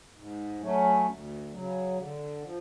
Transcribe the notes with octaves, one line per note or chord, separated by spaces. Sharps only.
G#2
F#3 A3 C#4
D2
C#3 F#3
D3
F3